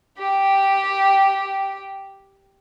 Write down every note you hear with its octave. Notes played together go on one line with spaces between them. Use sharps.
G4 G5